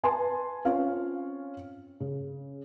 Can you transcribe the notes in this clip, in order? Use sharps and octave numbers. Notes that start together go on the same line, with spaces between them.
B4 G#5 A5 C6
C4 C#4 F4 C#5 F5
C#3